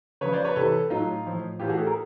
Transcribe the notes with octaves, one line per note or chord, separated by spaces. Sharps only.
C#3 F3 B4 C#5
C5 D5
B4 C#5
C3 E3 A4 B4
A2 F#3 D#4 F4
A2 F3
A2 E3 F4 G4
F#4 G#4
G4 A4
G#4 A#4